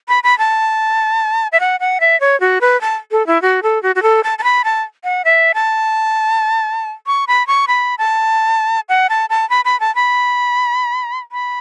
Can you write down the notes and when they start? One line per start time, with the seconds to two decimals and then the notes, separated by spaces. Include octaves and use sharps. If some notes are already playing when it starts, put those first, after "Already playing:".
0.08 B5
0.23 B5
0.38 A5
1.52 E5
1.60 F#5
1.80 F#5
2.01 E5
2.20 C#5
2.40 F#4
2.61 B4
2.81 A5
3.12 A4
3.27 E4
3.42 F#4
3.63 A4
3.83 F#4
3.95 F#4
4.03 A4
4.24 A5
4.39 A5
4.44 B5
4.64 A5
5.04 F#5
5.25 E5
5.54 A5
7.07 C#6
7.27 B5
7.47 C#6
7.68 B5
7.98 A5
8.89 F#5
9.10 A5
9.30 A5
9.50 B5
9.65 B5
9.80 A5
9.95 B5
11.32 B5